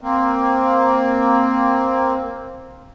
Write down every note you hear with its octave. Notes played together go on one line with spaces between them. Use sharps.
A#3 C4